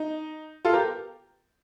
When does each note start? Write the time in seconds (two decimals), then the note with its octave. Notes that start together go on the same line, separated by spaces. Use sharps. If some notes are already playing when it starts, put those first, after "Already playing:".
Already playing: D#4
0.65 F4 A4
0.73 G4 A#4